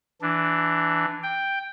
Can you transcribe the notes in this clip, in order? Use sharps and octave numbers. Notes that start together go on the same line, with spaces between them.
E3 D4
G5